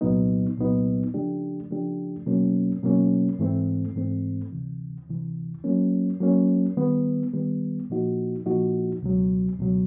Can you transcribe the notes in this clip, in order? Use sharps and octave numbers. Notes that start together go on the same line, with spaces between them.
C2 A#2 F#3 B3 D#4
C2 A#2 F#3 B3 D#4
C#3 F3 A3 D4 G4
C#3 F3 A3 D4 G4
B2 F#3 A#3 C#4
B2 F#3 A#3 C#4
G#2 E3 A3 C4
G#2 E3 A3 C4
D2 C3 E3
D2 C3 E3
F#3 A#3 C#4
F#3 A#3 C#4
D#3 G3 B3
D#3 G3 B3
A#2 F3 A#3 D#4 F#4
A#2 F3 A#3 D#4 F#4
C#2 B2 F#3
C#2 B2 F#3